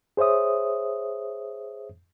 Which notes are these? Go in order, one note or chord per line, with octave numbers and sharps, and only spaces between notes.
G#4 C5 C#5 E5 D#6